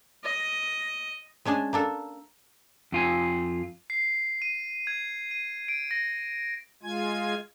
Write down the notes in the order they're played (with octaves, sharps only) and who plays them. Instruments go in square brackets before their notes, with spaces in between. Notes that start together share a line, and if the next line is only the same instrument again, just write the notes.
[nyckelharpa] D#5
[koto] G#3 C#4 D4 G#4 A5
A#3 D4 A4
[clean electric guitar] F2 F4 G#5
[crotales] C7
D#7
G#6
D#7
D7
A#6
[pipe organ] G#3 F4 G#5 G#6